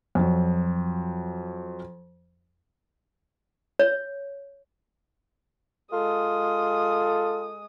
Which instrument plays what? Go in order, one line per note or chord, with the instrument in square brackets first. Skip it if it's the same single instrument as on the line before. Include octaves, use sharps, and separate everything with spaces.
[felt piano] F2 F#3
[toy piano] C#5
[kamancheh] G#3 D#6 [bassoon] F4 [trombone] A4